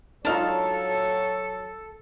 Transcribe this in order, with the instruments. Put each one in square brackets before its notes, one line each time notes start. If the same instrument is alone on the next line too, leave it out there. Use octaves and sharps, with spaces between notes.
[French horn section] F#3 C#5 [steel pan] D4 D#4 F4 [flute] A4 [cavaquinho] F5 A5